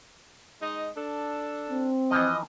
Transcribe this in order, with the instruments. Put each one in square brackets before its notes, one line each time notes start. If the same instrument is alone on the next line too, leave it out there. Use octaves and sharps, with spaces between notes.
[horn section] G#3 D#4 D#5
D4 A4
[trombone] C4
[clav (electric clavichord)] E3 F3 [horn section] D#5